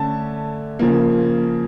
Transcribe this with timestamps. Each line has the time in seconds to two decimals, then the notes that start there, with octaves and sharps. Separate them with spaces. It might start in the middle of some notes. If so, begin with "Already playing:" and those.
Already playing: D3 A3 C#4 A5
0.79 C#3 F3 A#3